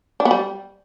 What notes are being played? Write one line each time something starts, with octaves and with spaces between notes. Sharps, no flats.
D4
B3
G3